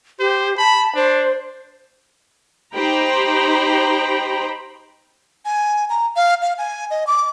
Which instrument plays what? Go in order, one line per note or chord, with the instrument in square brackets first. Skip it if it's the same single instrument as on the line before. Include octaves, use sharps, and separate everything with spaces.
[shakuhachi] G4 [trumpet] C5
[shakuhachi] A5 [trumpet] B5
[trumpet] D4 [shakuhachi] C5
[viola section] D#4 G4 C5 G5 A#5 B5
[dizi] G#5
A#5
F5
F5
G#5
D#5
D6